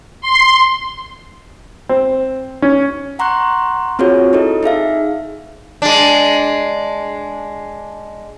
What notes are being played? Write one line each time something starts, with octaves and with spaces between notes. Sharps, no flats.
C6
C4
C#4
F#5 A#5 C6 C#6 F#6
C4 F4 F#4 G#4 C#5
D#4 E4 A4 D#5
D#4 G#4 E5 F5
G#3 D4